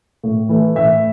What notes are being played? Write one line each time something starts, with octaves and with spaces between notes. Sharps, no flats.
A2
E3 A3
A2 E5